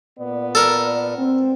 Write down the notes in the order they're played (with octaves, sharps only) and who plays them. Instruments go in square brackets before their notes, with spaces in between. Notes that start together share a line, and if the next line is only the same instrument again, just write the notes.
[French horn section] A#2 B3 D5
[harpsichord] A4 A#4
[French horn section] C4